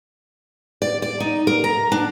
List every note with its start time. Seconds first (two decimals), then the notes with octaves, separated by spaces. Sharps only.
0.82 D5
1.02 D5
1.20 D#4
1.47 A#4
1.64 A#5
1.92 D4